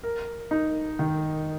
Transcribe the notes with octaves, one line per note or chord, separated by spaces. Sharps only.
A#4
D#4
D#3